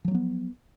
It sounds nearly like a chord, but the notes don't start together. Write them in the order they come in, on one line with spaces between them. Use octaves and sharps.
F3 F#3 A#3 B3